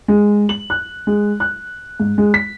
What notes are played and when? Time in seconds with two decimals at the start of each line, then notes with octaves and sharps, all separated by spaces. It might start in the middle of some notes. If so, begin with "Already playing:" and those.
0.08 G#3
0.49 F#7
0.70 F#6
1.07 G#3
1.40 F#6
2.00 G#2
2.18 G#3
2.34 B6